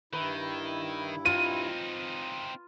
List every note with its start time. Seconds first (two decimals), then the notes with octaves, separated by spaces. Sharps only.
0.13 G2 D#3 E4 B4
1.26 C4 D#4 F4 D#7